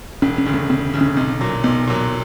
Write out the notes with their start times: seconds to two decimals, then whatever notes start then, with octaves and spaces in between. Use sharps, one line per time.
0.22 E1 C#4
0.38 C#4
0.46 D2 C#3
0.54 C#4
0.70 E1 C4
0.94 D2 C#3
1.01 C#4
1.17 B1 C4
1.41 A#2 F#3
1.64 B1 B3
1.87 A#2 F#3